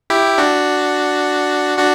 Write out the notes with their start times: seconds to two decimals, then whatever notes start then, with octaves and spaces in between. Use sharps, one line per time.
0.10 E4 G4
0.38 D4 F#4
1.78 D4 F#4